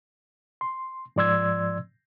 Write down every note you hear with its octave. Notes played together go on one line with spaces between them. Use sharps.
C6
G#2 F3 D5 C6 E6 G#6